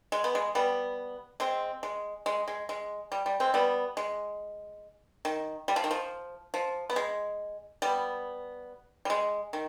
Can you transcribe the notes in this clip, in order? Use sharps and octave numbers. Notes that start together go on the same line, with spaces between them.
G#3
B3
G#3
G3 B3
G#3 C4
G#3
G#3
G#3
G#3
G3
G3
G#3 C4
G3 B3
G#3
D#3
G3
F3
D#3
F3
F3
B3
G#3
G3 B3
G3
G#3
D#3